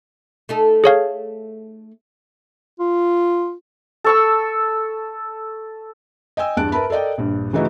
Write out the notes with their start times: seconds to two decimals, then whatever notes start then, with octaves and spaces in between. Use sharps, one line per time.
0.49 A3 D#4 A4
0.84 G#4 C#5 F5
2.80 F4
4.04 A4 C#6 E6
6.37 D#5 G5 G#5 E6
6.57 E2 G2 A5 F#6 D7
6.72 A#4 B4 E5 A5 B5
6.90 A4 A#4 D5 D#5 G5
7.18 A#1 G2
7.53 C#3 E3 A3 D#4 E4 F#4